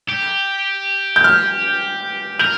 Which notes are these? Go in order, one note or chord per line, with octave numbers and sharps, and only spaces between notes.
G4
G6
F6
A#4 G6